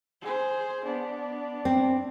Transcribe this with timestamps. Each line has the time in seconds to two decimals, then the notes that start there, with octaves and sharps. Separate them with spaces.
0.22 G#4 C5
0.85 B3 D4
1.65 C4